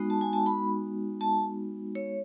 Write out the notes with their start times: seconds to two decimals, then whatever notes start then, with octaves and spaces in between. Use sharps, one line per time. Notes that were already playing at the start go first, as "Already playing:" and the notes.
Already playing: G#3 B3 D#4 F#4
0.10 A5
0.21 G#5
0.33 A5
0.46 B5
1.21 A5
1.95 C#5